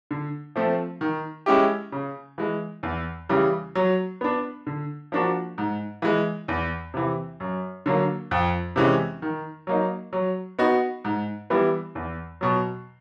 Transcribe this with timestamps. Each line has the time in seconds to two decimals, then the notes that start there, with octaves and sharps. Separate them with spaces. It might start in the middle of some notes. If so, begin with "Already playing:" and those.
0.11 D3
0.56 F3 A3 C4
1.01 D#3
1.46 G#3 C#4 E4 G4
1.92 C#3
2.38 E3 G#3
2.83 E2
3.29 C#3 E3 G3
3.75 F#3
4.21 B3 D4
4.67 D3
5.12 F3 A#3 D4 F#4
5.58 G#2
6.02 E3 G#3
6.48 E2
6.94 C3 E3
7.40 F#2
7.86 D3 F#3 A#3
8.31 F2
8.76 C3 E3 G#3 C#4
9.22 D#3
9.67 F#3 A#3 D#4
10.13 F#3
10.59 B3 D#4 F#4
11.05 G#2
11.50 E3 G3 B3 E4
11.95 E2
12.41 B2 F#3